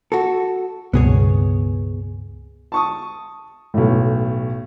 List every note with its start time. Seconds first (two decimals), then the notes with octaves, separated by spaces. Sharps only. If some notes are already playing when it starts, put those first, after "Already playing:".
0.12 F#4 A4
0.93 C#2 G2 B2 B3 G#4 C#5
2.72 A5 C#6 D#6
3.74 B1 A2